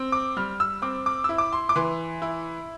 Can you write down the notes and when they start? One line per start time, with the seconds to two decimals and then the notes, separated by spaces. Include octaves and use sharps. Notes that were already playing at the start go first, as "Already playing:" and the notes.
Already playing: C4
0.12 D6
0.37 G3 F6
0.60 E6
0.82 C4 D6
1.06 D6
1.24 E4 E6
1.38 D6
1.53 C6
1.69 D6
1.76 E3 C6
2.22 E4